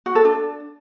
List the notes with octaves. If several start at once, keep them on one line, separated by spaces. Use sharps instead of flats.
F#4
A4
D4